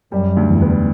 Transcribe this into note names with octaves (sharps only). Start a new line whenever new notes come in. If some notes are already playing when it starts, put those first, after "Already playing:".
F#2 G3
D2
E2
B3